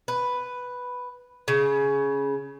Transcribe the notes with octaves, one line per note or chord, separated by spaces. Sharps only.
B4
C#3